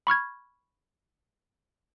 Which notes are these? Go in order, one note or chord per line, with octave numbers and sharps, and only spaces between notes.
B5 C#6 F6 G#6